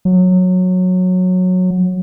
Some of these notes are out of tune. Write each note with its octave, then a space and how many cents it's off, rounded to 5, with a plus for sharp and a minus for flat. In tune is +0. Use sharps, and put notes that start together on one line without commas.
F#3 -15